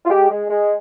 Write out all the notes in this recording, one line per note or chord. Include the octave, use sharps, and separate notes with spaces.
F4
G#3 G4
G#3
G#3